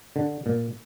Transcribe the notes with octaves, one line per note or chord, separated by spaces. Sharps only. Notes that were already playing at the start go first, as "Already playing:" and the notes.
D3
A#2